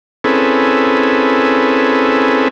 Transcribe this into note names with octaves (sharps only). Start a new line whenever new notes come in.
C4 C#4 E4 G#4 A4 B4